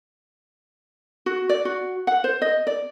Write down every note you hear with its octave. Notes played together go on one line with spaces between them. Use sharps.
F#4
D5
F#4
F#5
C5
D#5
D5